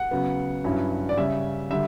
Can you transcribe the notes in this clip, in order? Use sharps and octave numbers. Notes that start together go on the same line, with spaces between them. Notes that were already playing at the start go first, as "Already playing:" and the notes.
Already playing: F#5
C#3 F#3 B3
G2 F#3 C#4 E4
D5
C#3 G3 C#4 E5
D3 G3 E5